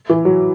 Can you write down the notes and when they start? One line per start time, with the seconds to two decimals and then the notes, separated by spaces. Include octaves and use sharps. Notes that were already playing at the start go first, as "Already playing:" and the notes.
0.10 E3
0.25 F#3